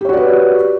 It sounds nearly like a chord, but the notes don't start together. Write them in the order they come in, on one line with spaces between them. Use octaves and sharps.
G4 C#5 F#4 D5 B4